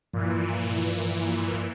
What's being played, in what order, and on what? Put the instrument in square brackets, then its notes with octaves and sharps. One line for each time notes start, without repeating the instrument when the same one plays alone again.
[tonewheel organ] G2 F3 [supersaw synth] A#2 E3